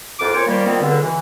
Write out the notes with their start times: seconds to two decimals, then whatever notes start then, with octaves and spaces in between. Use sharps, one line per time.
0.19 C2 F2 F4 D6
0.33 A#2 C5 C#5
0.46 D#3 F3 G3 A#3
0.65 D#3 F3 G3 B3 C4
0.81 C#2 B2 D3
1.01 E3